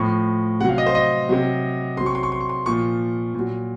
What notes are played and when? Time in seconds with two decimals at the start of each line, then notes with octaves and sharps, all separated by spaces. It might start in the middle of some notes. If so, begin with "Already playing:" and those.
Already playing: A2 F3 C#6
0.60 C3 F#5
0.65 F#3 F5
0.78 D#5
0.86 C5
0.95 D#5
1.29 C3 F#3
1.97 C3 F#3 C6
2.06 C#6
2.15 C6
2.23 C#6
2.32 C6
2.40 C#6
2.49 C6
2.66 A#2 F3 C#6
3.35 A#2 F#3